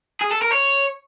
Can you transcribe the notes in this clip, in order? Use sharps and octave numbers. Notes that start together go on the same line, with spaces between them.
G#4
A4
A#4
C#5